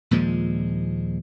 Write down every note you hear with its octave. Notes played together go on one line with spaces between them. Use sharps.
D#2 A#2 F3 G#3